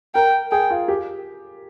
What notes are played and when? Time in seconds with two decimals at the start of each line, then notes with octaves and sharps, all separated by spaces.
0.15 A#4 G5
0.52 G#4 G5
0.70 F4
0.88 G4